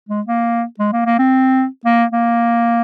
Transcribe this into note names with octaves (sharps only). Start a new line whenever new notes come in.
G#3
A#3
G#3
A#3
A#3
C4
A#3
A#3